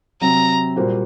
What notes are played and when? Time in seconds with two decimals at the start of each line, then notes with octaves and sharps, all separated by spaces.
0.21 C3 F#3 C4 A#5
0.76 A#2 G3 A#3 F#4 C5